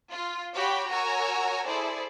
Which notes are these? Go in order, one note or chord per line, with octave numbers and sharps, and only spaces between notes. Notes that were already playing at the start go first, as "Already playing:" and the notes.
F4
F#4 G4 C#5 G5 B5
F#4 A#4 C#5 G#5 A#5 E6
E4 G#4 A4 C5 D5